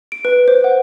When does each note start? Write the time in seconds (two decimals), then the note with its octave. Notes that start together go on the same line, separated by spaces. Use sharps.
0.12 D7
0.25 B4
0.48 C5
0.64 F#5